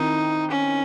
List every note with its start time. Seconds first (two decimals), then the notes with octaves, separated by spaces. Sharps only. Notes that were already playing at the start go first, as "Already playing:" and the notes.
Already playing: D#3 C4 D#4 E4
0.51 C#4